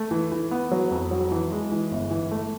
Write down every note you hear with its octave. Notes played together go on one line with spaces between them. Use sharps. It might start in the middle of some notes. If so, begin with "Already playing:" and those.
Already playing: A3
E3
E3
B3
F#3
F2
F#3
E3
G#3
E3
G1
E3
A3